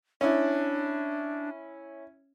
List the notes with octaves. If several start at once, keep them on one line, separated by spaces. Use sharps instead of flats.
C#4 D4 E4